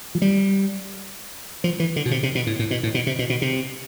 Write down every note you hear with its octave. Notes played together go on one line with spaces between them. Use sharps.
F3
G3
F3
E3
D3
B2
C3
C3
B2
A2
A2
B2
A2
B2
C3
B2
B2
C3